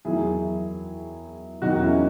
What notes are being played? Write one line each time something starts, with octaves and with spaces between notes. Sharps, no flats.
E2 D#3 F#3 E4 G#4
E2 D#3 F#3 D#4 F#4
C#4 E4